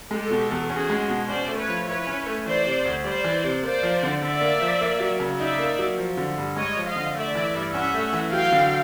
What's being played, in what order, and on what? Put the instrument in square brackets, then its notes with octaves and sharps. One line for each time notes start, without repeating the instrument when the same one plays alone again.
[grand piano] G#3 [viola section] G4 A4
[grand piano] B2
E2
[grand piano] C#4 [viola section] F#4 G#4
[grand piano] G#3
B2
[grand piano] C#4 [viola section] C5 D5
[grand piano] A3
[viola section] B4 C#5
[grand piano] F3
[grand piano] E4 [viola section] B4 C#5
[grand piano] C#4
A3
[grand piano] E3 [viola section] C5 D5
[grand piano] C3
D2
[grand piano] G3 [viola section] C5 D5
[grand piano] E3
C3
[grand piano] A#3 [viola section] C5 D5
[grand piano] F3
D3
[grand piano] D3 [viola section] D5 E5
[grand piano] A#3
F3
A#3
F#3
C#3
[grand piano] D#4 [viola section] D5 E5
[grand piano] A#3
F#3
F3
D3
G2
[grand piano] G#3 [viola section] C#5 D#5
[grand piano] F3
[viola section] D#5 F5
[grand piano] D3
[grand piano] A3 [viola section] D5 E5
[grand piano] E3
G2
[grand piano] C#4 [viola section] E5 F#5
[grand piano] A3
E3
[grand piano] F#3 [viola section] F5 G5
[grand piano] D3